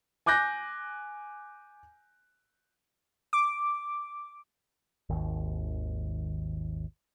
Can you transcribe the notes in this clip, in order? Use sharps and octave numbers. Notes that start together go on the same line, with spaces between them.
G#5 D6 F#6 G6 A#6
D6
G#1 D#2